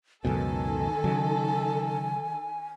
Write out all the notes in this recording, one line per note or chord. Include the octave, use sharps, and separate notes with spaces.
C#2 F#2 B2 D#3 A4 G#5
C#3 F#3